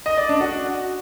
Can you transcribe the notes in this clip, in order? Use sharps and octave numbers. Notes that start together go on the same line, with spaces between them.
D#5
D5
D4
F#4